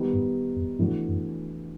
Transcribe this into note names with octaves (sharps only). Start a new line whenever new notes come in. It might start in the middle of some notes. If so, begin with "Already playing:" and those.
Already playing: D#3 G3 B3 D#4
G2
F2
G2 E3 A3 D4 F#4
F#2